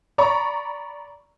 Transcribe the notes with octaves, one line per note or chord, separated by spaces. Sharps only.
D5 A#5 B5 C#6